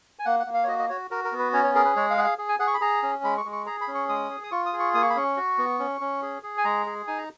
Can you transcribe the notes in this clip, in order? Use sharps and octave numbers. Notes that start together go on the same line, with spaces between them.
G#5
A#3 F#5
F#5
A#3
F5
C#5
F#4 D#5
D#5
F#4 C#5
F#4 A#4
A#4
B3
B4
C#4 C#5
C#5
G#4 A#4
B4
G#3 C#5
F5
G#4 F#5
F5
G#4
G#5
G#4 F#5
C#6
B5
G#4 A#5
C#4
G#3 B5
C#6
G#3
C#6
G#4 A#5
B5
C#4
C#6
G#3 D#6
G#4
D#6
F4 C#6
D#6
G#4
C#6
A#3 D#6
C#6
B5
C#4 C#6
F#4
B3
C#4
C#4
G#4
G#4
G#5
G#3 A#5
G#4
D#4 G#5
A#5